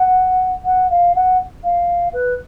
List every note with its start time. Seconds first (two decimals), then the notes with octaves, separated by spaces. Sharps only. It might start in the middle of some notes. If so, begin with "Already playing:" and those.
Already playing: F#5
0.65 F#5
0.90 F5
1.15 F#5
1.64 F5
2.13 B4